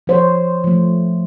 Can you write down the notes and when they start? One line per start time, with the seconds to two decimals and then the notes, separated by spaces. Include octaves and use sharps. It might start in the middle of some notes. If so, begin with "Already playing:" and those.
0.07 F3 C5 C#5
0.64 F3 A3